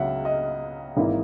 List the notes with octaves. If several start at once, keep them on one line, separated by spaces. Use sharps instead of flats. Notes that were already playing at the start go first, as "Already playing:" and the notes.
Already playing: C#2 C#3 F#3 E5 F#5
D#5
G#1 G#2 E3 A#3 E4